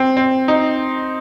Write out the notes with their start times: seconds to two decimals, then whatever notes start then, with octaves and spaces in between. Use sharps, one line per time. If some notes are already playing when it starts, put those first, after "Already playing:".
Already playing: C4
0.17 C4
0.48 D#4